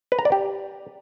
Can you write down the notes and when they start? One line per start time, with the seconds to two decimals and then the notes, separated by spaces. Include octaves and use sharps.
0.12 B4
0.19 A#5
0.25 D5
0.32 G4